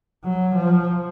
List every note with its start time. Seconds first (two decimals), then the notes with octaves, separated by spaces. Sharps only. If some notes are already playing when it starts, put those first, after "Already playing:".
0.24 F#3
0.56 F3